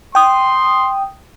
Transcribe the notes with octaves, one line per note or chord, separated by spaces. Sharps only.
G5 C6 D#6